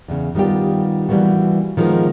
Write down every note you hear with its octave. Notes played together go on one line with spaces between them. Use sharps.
E2 C#3
D#3 G3 B3 F4 G4
E3 G3 A#3 B3 F#4
D#3 F3 G#3 B3 A#4